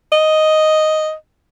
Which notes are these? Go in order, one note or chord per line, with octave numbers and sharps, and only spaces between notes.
D#5